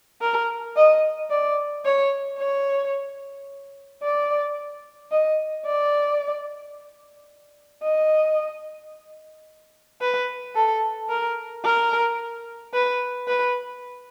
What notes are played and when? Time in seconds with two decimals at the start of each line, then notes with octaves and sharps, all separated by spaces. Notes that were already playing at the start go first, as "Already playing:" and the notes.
0.21 A#4
0.76 D#5
1.30 D5
1.85 C#5
2.39 C#5
4.03 D5
5.12 D#5
5.66 D5
7.83 D#5
10.01 B4
10.55 A4
11.09 A#4
11.64 A#4
12.74 B4
13.28 B4